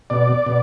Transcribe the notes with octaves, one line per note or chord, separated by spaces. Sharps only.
B2 D5
B2